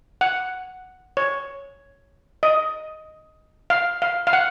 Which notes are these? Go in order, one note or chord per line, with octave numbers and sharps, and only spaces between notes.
F#5
C#5
D#5
F5
F5
F5
F#5